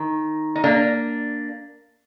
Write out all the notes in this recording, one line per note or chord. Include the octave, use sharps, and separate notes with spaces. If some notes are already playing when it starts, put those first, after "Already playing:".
Already playing: D#3
D#4
A#3 D4